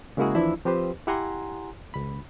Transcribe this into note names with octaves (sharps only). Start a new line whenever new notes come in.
C#3 G#3 A#3 E4 F#4 G#4
D#2 E3 F3 D4 E4
F3 C4 G4 B4 C5
E4 G4 F#5 G#5 A#5 C6
C#2 B5